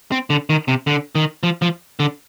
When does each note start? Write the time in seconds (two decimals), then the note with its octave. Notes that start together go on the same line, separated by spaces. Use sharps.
0.12 C4
0.30 D3
0.50 D#3
0.68 C3
0.87 D3
1.15 D#3
1.43 F3
1.62 F3
2.00 D3